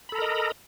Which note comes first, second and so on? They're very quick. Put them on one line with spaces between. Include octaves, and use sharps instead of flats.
B5 A4 A#5 A#4 D#5